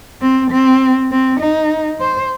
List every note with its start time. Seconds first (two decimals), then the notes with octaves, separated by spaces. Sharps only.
0.22 C4
0.51 C4
1.11 C4
1.40 D#4
2.00 C5